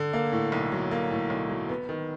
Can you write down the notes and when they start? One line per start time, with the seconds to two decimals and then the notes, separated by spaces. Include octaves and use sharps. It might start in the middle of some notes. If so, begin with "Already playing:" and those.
Already playing: D3
0.13 A#3
0.32 A2
0.52 B1
0.72 F#3
0.91 A#3
1.11 A2
1.30 B1
1.49 F#3
1.69 B3
1.89 D#3